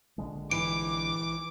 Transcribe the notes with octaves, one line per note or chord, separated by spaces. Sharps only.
A#1 D3 G#3
E3 D6 D7